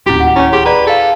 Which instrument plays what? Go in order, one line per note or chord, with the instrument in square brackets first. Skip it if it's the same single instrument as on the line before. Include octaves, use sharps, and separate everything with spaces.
[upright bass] D1 D#2 [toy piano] C#4 E4 F#4 [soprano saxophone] G4
[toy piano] F#5
[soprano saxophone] C#4 [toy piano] E4 C#5
[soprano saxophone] G4 [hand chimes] G#4 [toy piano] C6
[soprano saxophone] B4 [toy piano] D5 A#5
[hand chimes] G#4 F5 [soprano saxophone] A4